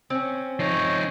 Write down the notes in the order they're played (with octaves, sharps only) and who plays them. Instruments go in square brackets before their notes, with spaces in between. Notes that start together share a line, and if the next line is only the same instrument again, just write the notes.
[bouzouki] C4 C#4
[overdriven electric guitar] F3 D#4 [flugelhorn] C#5